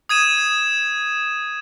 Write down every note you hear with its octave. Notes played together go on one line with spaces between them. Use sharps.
D#6 G#6 D#7 E7